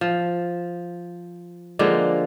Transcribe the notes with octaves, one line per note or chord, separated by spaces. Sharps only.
F3
D3 F3 G#3 A#3